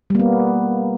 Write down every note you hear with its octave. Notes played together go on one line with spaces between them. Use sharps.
G3 A#3 B3